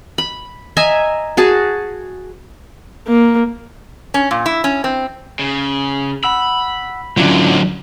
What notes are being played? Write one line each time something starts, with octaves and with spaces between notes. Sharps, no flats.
B5
D#5 E5 G#5 A#5
F#4 G#4 A5
A#3
C#4
A#2
E4
C#4
C4
C#3
F#5 B5 E6
G#2 D3 F#3 C#4 E4 F4 D5